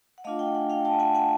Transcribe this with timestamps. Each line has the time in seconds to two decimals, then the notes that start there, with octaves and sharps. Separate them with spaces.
0.18 F#5
0.24 A3 D4 F4 D#5 F5
0.39 F5 G5
0.54 F#5 G#5
0.70 F5 G5
0.85 G5 A5
1.00 F#5 G#5
1.15 F#5 G#5